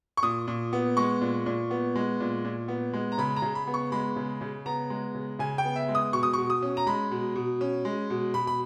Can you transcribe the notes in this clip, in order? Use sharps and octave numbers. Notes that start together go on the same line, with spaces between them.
C#6
A#2 D#6
A#2
B3
G#3 C#6
A#2
A#2
B3
G#3
A#2
A#2
B3
G#3
A#5
C#3 B5
A#5
C#3
B5
B3
C#6
G#3 B5
C#3
C#3
B3 A#5
G#3
C#3
C#3 G#5
G5
B3
E5
G#3
D#6
B2 C#6
D#6
B2 C#6
D#6
C#4
A#5
G#3 B5
B2
B2
C#4
G#3
B2
B2 B5
B5